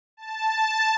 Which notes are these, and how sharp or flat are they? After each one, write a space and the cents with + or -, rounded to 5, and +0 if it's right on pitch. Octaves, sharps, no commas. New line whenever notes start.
A5 +0